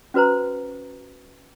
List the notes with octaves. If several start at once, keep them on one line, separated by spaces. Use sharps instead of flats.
C#4 F#4 B4 C5 A#5